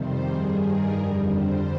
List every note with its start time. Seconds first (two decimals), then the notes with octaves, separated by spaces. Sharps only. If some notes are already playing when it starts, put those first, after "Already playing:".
Already playing: F2 C3 D#3 G3 C5
0.27 G2 D#3 G3 G#4
0.61 A#4
0.95 F2 D3 G3
1.30 C5